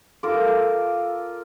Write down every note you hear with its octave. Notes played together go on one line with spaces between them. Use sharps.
F4 A4 A#4 D6